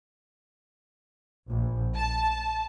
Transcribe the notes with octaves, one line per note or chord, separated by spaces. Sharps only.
A#1
A5